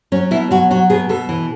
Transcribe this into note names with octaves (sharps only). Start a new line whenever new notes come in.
F#3 C#4
B2 E4
F#3 F#4
F#3 F#4
B2 G#4
B2 A4
E3